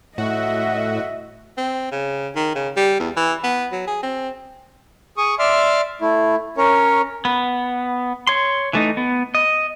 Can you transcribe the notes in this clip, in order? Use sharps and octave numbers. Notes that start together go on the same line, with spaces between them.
A2 F#4 D#5 E5
C4
C#3
D#3
C#3
G3
E2
E3
B3
F#3
G#4
C4
G#4 C#6 D#6
D5 E5 C6 D6 F6
A3 E4
C#4 A#4 C#5
B3
C#5 C6
E3 A3 D#4
B3
D#5